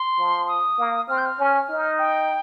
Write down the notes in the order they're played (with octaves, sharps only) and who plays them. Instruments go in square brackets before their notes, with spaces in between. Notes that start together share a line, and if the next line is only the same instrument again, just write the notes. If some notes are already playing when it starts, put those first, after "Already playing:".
Already playing: [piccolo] C6
[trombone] F3
[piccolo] D#6
[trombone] A#3
[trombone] C4 [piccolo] F6
[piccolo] G6
F6
[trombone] C#4
D#4
[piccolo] G5